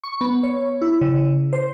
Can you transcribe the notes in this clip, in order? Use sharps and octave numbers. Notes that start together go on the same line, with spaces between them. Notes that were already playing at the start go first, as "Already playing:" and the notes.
C#6
B3
C#5
E4
C#3
C5